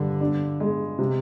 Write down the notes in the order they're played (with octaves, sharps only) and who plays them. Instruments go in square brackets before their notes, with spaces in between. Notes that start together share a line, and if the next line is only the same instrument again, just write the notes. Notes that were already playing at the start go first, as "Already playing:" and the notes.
Already playing: [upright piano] G2 [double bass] D3
[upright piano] D4
G#3
C3